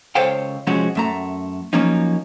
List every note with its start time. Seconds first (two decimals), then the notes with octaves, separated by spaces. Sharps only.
0.15 C#2 A4 C5 C#5 F5 G5
0.67 C3 F3 G#3 C#4 F#4
0.95 F#2 A3 A#5
1.73 F3 F#3 A#3 C#4 D#4